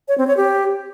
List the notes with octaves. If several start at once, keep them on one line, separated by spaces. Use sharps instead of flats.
C#5
C4
C#5
G4